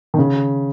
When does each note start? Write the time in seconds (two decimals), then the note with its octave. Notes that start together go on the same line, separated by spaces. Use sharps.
0.14 D#3
0.18 C#3